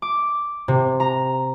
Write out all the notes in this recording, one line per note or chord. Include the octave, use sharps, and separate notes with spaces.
D6
C3
A#5